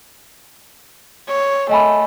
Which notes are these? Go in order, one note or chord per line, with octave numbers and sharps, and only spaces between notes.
C#5
A3 D#5 G#5 B5